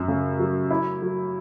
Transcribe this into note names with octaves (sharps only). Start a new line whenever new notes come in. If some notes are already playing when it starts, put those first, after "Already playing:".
Already playing: F#2
C#3
F#3
E4
F#3